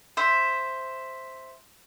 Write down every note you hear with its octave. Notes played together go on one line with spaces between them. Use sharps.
C5 E5